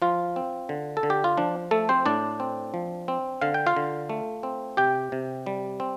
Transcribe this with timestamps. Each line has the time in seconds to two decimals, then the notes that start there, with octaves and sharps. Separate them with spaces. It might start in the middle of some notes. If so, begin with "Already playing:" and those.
0.02 F3 F4
0.36 C4
0.69 D3
0.97 A4
1.03 D3
1.10 G4
1.24 F4
1.37 F3 D4
1.71 A3 A4
1.89 C4 C5
2.06 A2 D4 D5
2.40 C4
2.74 F3
3.08 C4
3.41 D3 F5
3.54 G5
3.66 F4 F5
3.76 D3
4.09 A3
4.43 C4
4.77 C3 G4 G5
5.12 C3
5.46 G3
5.80 C4